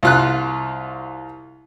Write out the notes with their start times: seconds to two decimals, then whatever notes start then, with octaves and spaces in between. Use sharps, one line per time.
0.03 C2 F4 F#6